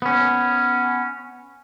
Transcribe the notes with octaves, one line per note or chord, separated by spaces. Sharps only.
B3 C#4